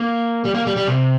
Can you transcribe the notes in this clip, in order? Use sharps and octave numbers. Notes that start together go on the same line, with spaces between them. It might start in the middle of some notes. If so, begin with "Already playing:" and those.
Already playing: A#3
G3
A#3
G3
G3
C3